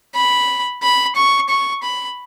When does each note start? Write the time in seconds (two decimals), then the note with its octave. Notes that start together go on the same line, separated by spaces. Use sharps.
0.15 B5
0.83 B5
1.16 C#6
1.49 C#6
1.83 B5